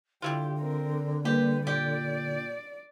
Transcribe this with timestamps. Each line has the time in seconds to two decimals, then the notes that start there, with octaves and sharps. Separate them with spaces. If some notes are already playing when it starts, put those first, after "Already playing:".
0.22 D3 G3 E4 F4 G4
0.60 C4 A#4
1.25 G3 A#3 G4 B4
1.67 A#2 G4 D5